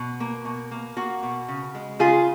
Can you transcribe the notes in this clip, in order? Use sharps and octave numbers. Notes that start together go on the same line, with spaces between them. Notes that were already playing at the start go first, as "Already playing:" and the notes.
Already playing: B2
A#3
B2
A#3
A#3 F#4
B2
C#3
G#3
C#3 F4 G#4